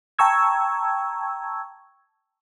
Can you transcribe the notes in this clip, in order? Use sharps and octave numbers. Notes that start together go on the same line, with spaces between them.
G5 A5 A#5 C#6 E6 G#6